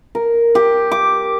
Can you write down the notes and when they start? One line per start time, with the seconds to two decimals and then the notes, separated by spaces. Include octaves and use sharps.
0.15 A#4
0.55 G4
0.91 D6